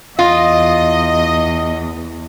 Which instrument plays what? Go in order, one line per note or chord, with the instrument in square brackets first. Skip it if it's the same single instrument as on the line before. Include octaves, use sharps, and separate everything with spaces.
[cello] E2 [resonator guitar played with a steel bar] F4 [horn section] D#5